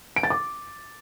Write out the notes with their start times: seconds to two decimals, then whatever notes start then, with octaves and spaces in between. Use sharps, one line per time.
0.16 D7
0.23 A6
0.30 D6